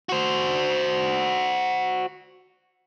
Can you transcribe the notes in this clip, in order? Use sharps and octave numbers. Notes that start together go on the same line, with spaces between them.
F#4 C5